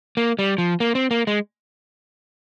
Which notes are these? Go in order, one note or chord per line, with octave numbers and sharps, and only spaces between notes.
A#3
G3
F3
A#3
C4
A#3
G#3